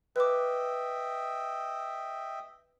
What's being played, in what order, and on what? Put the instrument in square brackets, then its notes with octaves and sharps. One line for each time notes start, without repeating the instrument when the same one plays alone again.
[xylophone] B4 D6 [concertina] D#5 E5 G5